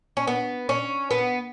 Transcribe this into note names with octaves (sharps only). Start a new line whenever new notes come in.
C#4
B3
C#4
B3